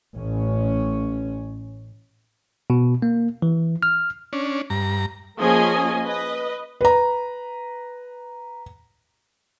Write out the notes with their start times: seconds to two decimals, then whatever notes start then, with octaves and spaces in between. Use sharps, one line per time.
0.15 A1 C#4
2.70 B2
3.02 A#3
3.42 E3
3.83 F6
4.33 C#4 D4
4.70 G2 A#5
5.39 F3 A#3 C#4 G#4 D#5 G#5
6.04 B4 D#5
6.81 B4 A#5